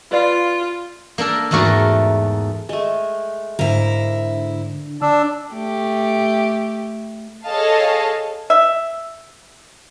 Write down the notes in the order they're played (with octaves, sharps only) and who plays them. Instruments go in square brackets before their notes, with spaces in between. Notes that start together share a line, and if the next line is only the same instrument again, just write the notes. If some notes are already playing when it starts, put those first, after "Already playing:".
[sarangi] F4 [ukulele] B4 D5 F5
[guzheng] A#3 D4 A4 A#4
E2 G#2 A3 F#4 A#4 D5
[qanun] G#3 A3
[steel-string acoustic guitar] G#2 E4 [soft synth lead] D3 [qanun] A#4 F5
[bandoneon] D4 [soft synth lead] E6
[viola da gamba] A3 G4
[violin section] G#4 A4 C#5 D#5 F5 A5
[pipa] E5